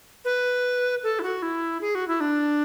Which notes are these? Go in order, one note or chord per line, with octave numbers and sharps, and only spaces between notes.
B4
A4
E4
F#4
E4
G#4
F#4
E4
D4